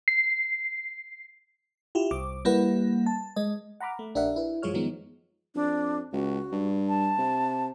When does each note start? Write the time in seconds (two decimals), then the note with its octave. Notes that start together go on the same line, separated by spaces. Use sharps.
0.08 C7
1.95 E4 F4 G4
2.11 C2 D6
2.45 G3 A#3 E4 B4 F#5
3.07 A5
3.36 G#3 D#5
3.80 F#5 A#5 B5 D6 F6
3.99 A3
4.15 A#1 D4 G4 A#4 E5 F#5
4.36 E4 B4
4.62 F#2 F3 G#3 F4 C#5 F6
4.74 D#3 F3 G#3 B3 D#4
5.55 F2 D4
6.13 C#2 F#4
6.52 G2
6.89 A5
7.18 C3